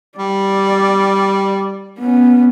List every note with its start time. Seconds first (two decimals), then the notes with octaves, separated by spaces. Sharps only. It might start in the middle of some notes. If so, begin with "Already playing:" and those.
0.19 G3 D5
1.99 B3 C#4